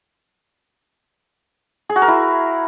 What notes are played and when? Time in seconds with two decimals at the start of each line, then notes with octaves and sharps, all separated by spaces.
1.89 G#4
1.96 F#4
2.02 A#4
2.08 E4